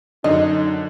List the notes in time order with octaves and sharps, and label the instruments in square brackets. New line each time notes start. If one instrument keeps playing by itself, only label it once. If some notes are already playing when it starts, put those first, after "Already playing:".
[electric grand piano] F#2 D3 D4 [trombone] D#4 [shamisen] D#5